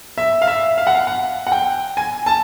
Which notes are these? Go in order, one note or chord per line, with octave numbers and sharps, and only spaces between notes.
E5
F5
E5
F5
F#5
F5
F#5
F#5
G5
G#5
A5